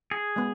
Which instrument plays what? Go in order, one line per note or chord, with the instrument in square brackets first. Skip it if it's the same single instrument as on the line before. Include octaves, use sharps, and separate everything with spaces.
[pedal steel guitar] G#4
[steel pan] G#3 B3